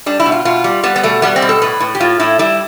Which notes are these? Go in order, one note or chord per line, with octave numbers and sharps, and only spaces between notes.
G3 D4
E4
B2
F4
B2 F4
G3
G3 B3
B3
B2 A3
G3 B3
C4
B2
A4
A2 B4
A2
G4
A2 F4
A2 E4
G3 E4